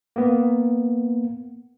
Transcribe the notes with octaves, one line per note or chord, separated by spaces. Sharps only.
A#3 B3